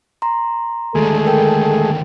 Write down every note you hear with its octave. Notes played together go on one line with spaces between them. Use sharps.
A#5 C6
D#2 D3 G#3 A3 G#4 A4
A#4 G5